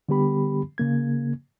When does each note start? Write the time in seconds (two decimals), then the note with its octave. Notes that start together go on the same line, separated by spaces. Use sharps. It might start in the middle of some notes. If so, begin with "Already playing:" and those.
0.09 D3 G3 B3 G4 B5
0.78 C#3 A#3 G#6